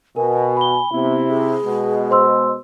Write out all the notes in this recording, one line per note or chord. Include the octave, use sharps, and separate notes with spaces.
B2 A#4 G#5
B5 G7
C3 B3 E4
G#4
B2 G#3
C5 C6 E6